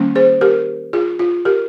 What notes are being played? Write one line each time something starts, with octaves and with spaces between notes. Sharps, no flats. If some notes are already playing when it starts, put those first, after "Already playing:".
Already playing: D#3 G3 A#3 C#4
G#4 C5
G4 A#4
F4 G#4
F4
G4 A#4